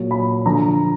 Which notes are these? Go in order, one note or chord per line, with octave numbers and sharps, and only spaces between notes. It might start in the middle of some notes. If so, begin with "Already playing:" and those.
Already playing: A#2 F#3
B5
D3 F3 A#5